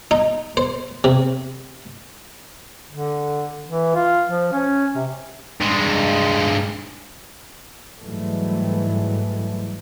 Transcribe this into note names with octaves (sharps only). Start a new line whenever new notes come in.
D#4
C5
C3
D3
E3
F4
F3
C#4
C3
G2 G#3
G#2 E3 F#3 G3 A3